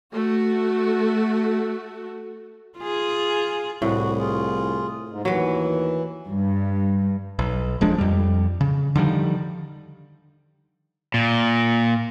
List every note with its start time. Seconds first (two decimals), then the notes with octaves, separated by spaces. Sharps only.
0.12 A3 F#4
2.79 F4 G#4
3.82 C2 A2 F#4
4.19 F4 G#4
5.09 G#2
5.25 D#2 E3 F#3 B4
6.29 G2
7.39 B1
7.81 D#1 F3 G#3 D4
7.98 F2 G3
8.61 C#3
8.95 D3 D#3 F3 G3
11.14 A#2